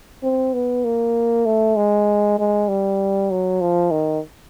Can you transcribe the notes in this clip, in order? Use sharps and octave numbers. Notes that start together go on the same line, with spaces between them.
C4
B3
A#3
A3
G#3
G#3
G3
F#3
F3
D#3